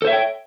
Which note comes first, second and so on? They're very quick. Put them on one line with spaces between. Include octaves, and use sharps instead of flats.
A4 C5 E5 C#5 G5